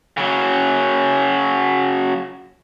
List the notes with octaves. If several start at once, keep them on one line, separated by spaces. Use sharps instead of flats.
C#3 F#3